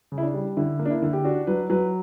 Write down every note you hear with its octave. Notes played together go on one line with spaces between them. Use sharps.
C#3
E4
D4
G3
D3 E4
A#3
D4
E4
D3
G4
D4 F#4
F#3 B4
F#3 B4